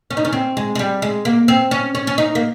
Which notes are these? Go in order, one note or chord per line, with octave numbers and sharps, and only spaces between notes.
C#4
D#4
C#4
C4
G#3
G#3
G3
G#3
A#3
C4
C#4
C#4
C#4
D#4
A#3